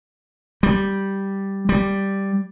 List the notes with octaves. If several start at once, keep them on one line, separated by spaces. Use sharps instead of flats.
G3
G3